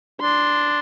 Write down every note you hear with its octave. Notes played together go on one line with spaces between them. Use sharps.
D4 C6